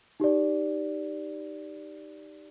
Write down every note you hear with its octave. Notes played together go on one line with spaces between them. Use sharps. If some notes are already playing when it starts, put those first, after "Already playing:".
D#4 G4 D5